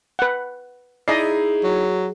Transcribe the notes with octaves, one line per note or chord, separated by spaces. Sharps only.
B4 F#5
D#4 E4 G#4 D5 D#5 C7
F#3